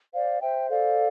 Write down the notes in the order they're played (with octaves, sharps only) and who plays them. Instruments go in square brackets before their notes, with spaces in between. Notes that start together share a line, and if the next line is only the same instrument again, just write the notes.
[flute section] C5 D5 F5
C5 E5 G5
A4 D5 F5